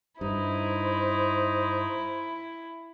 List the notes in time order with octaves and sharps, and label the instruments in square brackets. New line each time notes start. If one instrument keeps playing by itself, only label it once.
[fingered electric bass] G2 [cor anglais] D#4 [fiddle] E4 [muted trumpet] C5